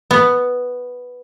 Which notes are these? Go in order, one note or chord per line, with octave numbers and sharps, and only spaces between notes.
B3